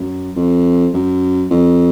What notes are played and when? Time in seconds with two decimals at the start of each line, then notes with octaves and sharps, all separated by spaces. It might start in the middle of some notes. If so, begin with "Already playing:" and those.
Already playing: F#2
0.36 F2
0.93 F#2
1.50 F2